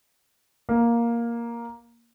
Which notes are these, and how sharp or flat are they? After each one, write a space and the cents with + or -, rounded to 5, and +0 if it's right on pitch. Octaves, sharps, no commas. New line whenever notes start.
A#3 +5